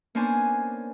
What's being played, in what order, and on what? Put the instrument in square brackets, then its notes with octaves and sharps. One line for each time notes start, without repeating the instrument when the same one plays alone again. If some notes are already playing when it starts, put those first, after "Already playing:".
[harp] A#3 B3 C#4 D4 C5 G#5